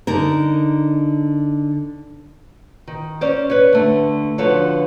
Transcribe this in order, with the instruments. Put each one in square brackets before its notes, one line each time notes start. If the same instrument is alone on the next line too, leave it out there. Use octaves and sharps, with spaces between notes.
[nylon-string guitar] D3 D#4 A#4
D#3
C#4 C5 D5
B4 C#5
D3 A3
D3 F3 F#4 A4 B4 C#5